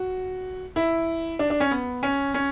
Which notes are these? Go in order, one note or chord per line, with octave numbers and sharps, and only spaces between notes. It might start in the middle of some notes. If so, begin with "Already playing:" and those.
Already playing: F#4
E4
D4
D4
C#4
B3
C#4
C#4